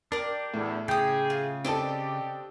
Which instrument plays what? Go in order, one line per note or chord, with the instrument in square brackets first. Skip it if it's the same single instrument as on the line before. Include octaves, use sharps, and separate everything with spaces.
[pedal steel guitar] D4 G4 [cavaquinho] A#4 D5
[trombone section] E2 [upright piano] A2
[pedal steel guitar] C#3 G6 [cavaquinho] G4 D#6 [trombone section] G#4
[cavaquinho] F4
[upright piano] C4 A4 [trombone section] D4 G4 [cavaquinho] D5 D#5 A5